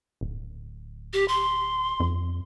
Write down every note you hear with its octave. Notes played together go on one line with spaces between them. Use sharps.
D1
G4
C6
F2